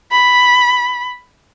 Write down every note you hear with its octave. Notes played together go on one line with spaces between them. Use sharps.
B5